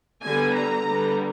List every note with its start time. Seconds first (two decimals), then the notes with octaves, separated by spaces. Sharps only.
0.24 D3 G3 B3 G#5
0.55 A#5
0.85 D3 G3 B3